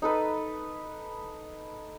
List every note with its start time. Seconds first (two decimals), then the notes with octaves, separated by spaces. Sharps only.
0.02 D#4 A4 B4